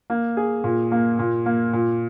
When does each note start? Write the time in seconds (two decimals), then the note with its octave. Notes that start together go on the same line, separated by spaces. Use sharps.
0.10 A#3
0.37 G#4
0.64 A#2
0.92 A#3
1.19 A#2
1.46 A#3
1.73 A#2